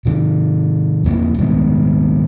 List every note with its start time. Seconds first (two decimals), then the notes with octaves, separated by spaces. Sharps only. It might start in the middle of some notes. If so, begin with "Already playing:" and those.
0.06 C3 D#3
1.04 E2 F3 A#3
1.38 C3 D#3 G#3 B3